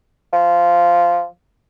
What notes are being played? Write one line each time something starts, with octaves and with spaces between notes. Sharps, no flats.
F3